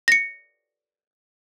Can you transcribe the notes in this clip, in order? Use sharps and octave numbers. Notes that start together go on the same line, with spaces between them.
A#6 C#7